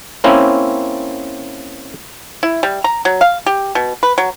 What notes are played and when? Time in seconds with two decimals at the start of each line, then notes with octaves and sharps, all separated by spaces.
0.24 A#3 C4 C#4 E4
2.43 E4
2.63 G3
2.84 A#5
3.05 F#3
3.21 F5
3.46 G4
3.75 B2
4.03 B4
4.18 F#3